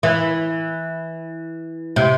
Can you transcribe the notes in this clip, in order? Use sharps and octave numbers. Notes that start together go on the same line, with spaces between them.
E3
C3